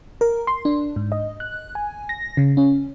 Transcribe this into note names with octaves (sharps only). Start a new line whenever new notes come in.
A#4
C6
D4
G#2
D#5
F#6
G#5
A#6
C#3
C#4